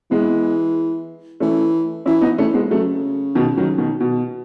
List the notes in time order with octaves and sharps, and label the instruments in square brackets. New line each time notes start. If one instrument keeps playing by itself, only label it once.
[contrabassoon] E3 [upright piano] G#3 B3
[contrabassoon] E3 [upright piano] A3 C#4
[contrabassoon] E3 [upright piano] C#4 E4
[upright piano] B3 D#4
[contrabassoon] E3 [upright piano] A3 C#4
[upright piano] G#3 B3
[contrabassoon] C#3 [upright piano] F#3 A3
[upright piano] B2 D#3
D#3 F#3
B2 D#3
B2